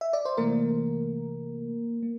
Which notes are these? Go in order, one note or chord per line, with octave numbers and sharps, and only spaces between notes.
E5
D5
C5
C3 E3 A3 A#3 A#4
A#3